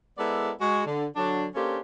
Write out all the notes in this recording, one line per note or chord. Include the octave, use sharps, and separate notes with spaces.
G#3 B3 E4 A4 A#4 D5
G#3 F#4
D3
D3 F#3 D4
A#3 C#4 D4 G4 A4 C5